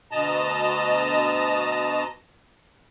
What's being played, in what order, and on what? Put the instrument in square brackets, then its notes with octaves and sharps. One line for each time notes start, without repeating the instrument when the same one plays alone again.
[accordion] D2 B2 D#5 A5 A#5